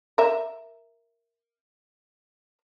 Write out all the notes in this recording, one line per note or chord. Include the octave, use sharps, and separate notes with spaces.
A#4 E5